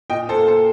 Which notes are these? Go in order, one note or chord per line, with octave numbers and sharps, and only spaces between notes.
A#2 D#5 G5
A4 C5
A#3
A4 C5